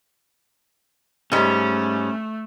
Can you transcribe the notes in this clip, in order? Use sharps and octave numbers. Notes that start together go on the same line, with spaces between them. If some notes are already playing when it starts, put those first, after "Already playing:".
G#2 G3 A3 C#4